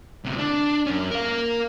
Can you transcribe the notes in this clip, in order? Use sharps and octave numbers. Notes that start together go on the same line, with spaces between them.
D2 C3
D4
F#2 C#4
A#4 F5